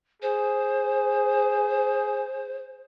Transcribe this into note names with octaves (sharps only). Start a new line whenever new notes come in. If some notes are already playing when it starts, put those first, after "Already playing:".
G#4 C5